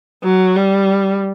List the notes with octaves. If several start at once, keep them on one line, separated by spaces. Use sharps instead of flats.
F#3
G3